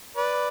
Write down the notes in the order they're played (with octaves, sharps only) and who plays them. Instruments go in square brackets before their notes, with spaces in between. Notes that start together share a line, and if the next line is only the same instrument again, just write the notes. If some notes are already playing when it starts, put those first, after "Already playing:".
[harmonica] B4 D5